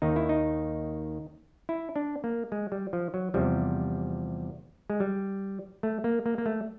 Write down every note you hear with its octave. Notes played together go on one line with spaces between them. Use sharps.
D#2 D#3 D#4
E4
D#4
E4
D4
A#3
G#3
G3
F3
F#3
E2 C3 F3 G3
G#3
G3
A3
A#3
A#3
A#3
A3